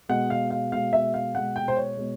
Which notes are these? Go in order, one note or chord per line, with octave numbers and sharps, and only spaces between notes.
B2 G#3 F#5
F5
F5
B2 G#3 F5
E5
F5
B2 G#3 F#5
G5
C5
C#5
B2 G#3